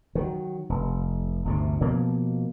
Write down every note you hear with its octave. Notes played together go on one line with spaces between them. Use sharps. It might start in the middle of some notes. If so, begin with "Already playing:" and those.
D#3 F#3
F1
G1 D2 C3
B2 F3 A#3